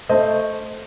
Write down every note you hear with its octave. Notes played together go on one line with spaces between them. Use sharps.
A3 C5 D#5